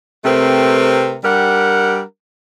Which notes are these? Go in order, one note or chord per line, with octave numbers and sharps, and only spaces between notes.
C3 A3 C4 A#4 B4
G3 D4 G4 A#4 F#5